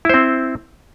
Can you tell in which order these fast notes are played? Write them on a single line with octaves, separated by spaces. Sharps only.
E4 C5 C4